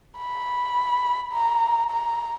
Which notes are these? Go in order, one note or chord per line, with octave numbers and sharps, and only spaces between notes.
B5
A#5
A#5